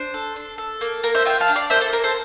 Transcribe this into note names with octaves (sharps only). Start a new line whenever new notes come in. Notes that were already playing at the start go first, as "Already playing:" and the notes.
Already playing: D4 C5
A4
D4
A4
A#3
A#3 A#4
C5 E5
F4 E5 G5
F5 A5
D4
D5 F5
A#3 C5 E5
A4 C5
A#3 A#4
A4 C5